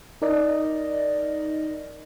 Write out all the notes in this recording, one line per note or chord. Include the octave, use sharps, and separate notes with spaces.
D#4 A#4 D5 D#5